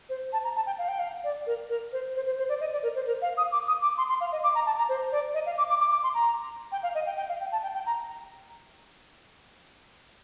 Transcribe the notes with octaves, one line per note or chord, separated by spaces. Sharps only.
C5
A5
A#5
A5
G5
F5
G5
F5
D5
A#4
A#4
C5
C5
C5
C5
D5
D#5
D5
A#4
C5
A#4
F5
D#6
D6
D#6
D6
C6
C6
F5
D#5
D6
A#5
A5
A#5
C5
D5
D#5
F5
D6
D6
D6
D6
C6
A#5
G5
F5
D#5
G5
G5
F5
G5
A5
G5
G5
A#5